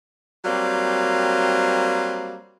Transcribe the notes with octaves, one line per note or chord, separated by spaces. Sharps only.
F#3 G3 A#3 C4